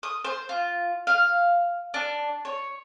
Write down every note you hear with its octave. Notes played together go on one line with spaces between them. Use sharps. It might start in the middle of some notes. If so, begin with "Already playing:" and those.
D#6
C5
F4
F5
D4
C#5